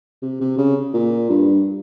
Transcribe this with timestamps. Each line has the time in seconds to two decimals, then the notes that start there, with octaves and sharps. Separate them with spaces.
0.22 C3
0.41 C3
0.58 C#3
0.94 A#2
1.29 G2